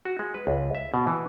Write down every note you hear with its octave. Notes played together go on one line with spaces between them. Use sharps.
F#4
G#3
B4
C#2
E5
B2
E3